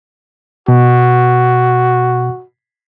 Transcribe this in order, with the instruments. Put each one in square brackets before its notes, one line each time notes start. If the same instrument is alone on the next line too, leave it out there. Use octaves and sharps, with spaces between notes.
[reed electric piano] B2 [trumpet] F#4